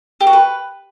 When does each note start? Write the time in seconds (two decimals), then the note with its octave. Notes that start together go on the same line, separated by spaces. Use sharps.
0.21 G4
0.27 F#4
0.33 B4